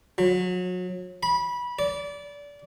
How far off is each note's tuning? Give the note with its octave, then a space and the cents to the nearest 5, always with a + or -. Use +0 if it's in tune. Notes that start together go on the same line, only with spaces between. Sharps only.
F#3 -30
B5 -20
D5 -25